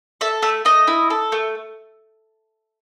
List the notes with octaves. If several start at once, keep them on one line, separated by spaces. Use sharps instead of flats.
A4 E5
A3 E5
A3 D#5
E4
A4
A3